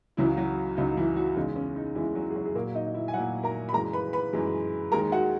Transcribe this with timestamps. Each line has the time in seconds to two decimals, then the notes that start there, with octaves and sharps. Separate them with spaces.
0.17 C#2 C#3 E3 F#3 E4
0.37 F#3 F#4
0.77 C#2 C#3 F#3 D#4
0.97 E3 E4
1.16 F#3 F#4
1.36 E2 C#3 G#3 D#4
1.56 C#4
1.76 D#4
1.95 E2 C#3 E3 G#3 E4
2.15 F#3 F#4
2.30 G#4
2.36 F#3 F#4
2.46 G#4
2.55 A#2 F#3 A#3 A#4
2.75 D#4 D#5
2.88 D#5
2.94 E4 E5
3.08 G#5
3.14 F#3 F#4 F#5
3.18 A#2
3.43 A#4 A#5
3.69 B5
3.73 F#2 E3 G#3 A#4 A#5
3.93 B4 B5
4.13 B4 B5
4.33 F#2 E3 G#3
4.92 D#2 D#3 G#3 A#4 A#5
5.12 F#4 F#5